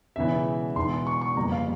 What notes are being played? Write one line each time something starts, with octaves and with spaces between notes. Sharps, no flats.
E1 E2 C#3 E3 E5
E1 E2 E3 C6
C#6
C#6
G1 F2 C#3 G3 A#3 A#5
F5